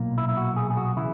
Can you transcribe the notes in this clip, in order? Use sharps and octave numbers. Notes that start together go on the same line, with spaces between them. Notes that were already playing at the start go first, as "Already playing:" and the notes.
Already playing: B1 A#2 A#3
E4
E4
F#4
G#4
G#4
F#4
C#3 E3 E4